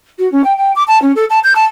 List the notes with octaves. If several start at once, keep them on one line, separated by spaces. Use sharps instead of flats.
F#4
C#4
G5
G5
D6
A5
C#4
A4
A5
G6
A5